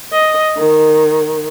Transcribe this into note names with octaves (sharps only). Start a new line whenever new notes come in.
D#5
D#3